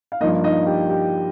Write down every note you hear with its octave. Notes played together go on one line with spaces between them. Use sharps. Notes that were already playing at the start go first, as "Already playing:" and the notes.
F5
G2 F3 A#3 D#4 D#5
D#4 D#5
G4 G5
G4 G5